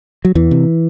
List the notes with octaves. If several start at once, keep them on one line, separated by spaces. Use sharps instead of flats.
F#3
E2 E3
C3